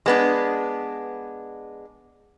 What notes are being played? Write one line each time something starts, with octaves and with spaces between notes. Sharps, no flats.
G#3 B3 D4